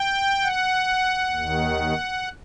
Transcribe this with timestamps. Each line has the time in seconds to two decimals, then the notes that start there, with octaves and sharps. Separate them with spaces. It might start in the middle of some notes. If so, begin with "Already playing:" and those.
Already playing: G5
0.43 F#5
1.31 D#2
1.36 D#3